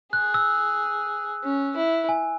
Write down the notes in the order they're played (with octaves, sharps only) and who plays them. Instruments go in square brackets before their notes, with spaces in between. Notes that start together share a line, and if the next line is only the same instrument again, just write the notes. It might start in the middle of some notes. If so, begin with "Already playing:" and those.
[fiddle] G#4 [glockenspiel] F#6
[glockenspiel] E6
[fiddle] C#4
E4
[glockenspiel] G#5